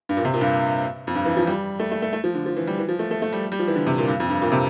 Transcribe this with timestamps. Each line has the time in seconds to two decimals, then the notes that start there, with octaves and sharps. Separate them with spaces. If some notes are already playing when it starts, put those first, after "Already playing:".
0.09 G2
0.17 A#2
0.25 C3
0.33 A#2
0.41 G2
1.07 F2
1.15 G2
1.25 E3
1.37 F3
1.47 G3
1.80 A3
1.92 A3
2.02 A3
2.13 A3
2.24 F3
2.35 D3
2.46 F3
2.56 E3
2.67 G3
2.79 E3
2.89 F3
2.99 A3
3.11 A3
3.22 A3
3.33 G3
3.52 G3
3.59 F3
3.67 E3
3.76 D3
3.87 C3
3.98 A#2
4.08 G2
4.20 F2
4.30 G2
4.42 A#2
4.52 C3